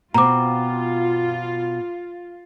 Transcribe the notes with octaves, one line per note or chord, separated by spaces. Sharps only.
B2 C4 F4 A#5 D6